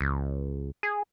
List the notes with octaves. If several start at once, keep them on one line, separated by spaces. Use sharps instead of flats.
C#2
G#4